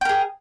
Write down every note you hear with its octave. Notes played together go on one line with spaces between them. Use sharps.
G#4 A#4 G5